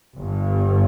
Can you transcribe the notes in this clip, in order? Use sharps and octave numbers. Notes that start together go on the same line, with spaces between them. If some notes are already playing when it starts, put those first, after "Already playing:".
G1 G2